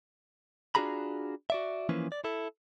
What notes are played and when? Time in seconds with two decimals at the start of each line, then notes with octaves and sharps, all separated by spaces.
0.75 D4 F4 F#4 G#4 A#5 B5
1.50 F#4 D5 E5
1.89 E3 F3 A#3 C#4 E4 B4
2.12 D5
2.24 E4 A4